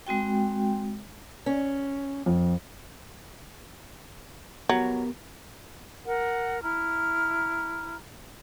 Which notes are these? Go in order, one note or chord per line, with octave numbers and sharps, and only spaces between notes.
G#3 C4 F#4 G5
C#4
F2
F#3 B3 G4 A#4
A#4 F#5
E4 A#5 F6